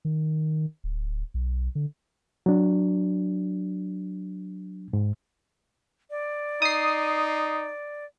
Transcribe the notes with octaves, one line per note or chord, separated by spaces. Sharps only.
D#3
D1
B1
D3
F#3 D4
G#2
D5
D#4 D#6 C7